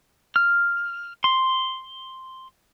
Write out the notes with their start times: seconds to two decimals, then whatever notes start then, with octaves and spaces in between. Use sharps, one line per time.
0.36 F6
1.24 C6